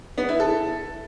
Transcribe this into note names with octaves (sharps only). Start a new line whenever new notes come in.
B3
E4
A4